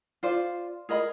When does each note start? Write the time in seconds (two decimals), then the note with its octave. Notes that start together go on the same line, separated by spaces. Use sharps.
0.23 F4 C5 D5
0.89 G#4 A#4 D#5 B5